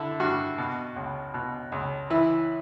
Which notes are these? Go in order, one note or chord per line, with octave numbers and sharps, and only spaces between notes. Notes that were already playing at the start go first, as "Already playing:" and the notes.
Already playing: D3 E4
G2 F#4
B2
C#2
B2
C#2
E3 E4